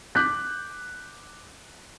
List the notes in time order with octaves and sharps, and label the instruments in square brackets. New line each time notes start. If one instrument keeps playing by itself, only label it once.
[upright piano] D6 F#6 G6 B6